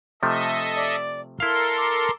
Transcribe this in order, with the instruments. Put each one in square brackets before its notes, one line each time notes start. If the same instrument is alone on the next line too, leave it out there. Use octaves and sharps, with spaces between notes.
[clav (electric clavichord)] C3 F3 A3 [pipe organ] A4 D#5 E5
[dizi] D5
[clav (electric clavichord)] E4 F5 [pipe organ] A4 A#4 C6 [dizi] F6
[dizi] D6